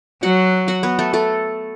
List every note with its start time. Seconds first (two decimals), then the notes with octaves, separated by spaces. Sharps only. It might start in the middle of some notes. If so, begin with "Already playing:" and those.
0.23 F#3 F#4 F#5
0.68 F#4 F#5
0.83 B3 B4
0.99 A3 A4
1.13 A3 A4